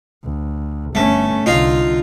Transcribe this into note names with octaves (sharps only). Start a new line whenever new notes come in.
D2
G1 A3 C#4
C2 D3 D#4 F4